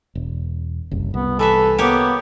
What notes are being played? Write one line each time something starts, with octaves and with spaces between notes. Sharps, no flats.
E1
F#1 C2
C2 B3
E3 A4 B4 E5
A#3 B3 G4 C#5